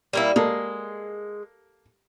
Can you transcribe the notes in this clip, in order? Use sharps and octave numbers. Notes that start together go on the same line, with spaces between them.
G3 A#3 E4
G#3 A#3 A4